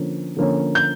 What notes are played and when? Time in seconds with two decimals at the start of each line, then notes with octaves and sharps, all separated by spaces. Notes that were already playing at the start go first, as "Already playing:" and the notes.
Already playing: D3 F3 A#3 C#4
0.37 D3 F3 A#3 C#4
0.75 G6